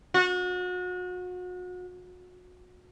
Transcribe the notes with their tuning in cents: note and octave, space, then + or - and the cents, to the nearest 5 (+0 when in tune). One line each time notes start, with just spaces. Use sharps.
F#4 -35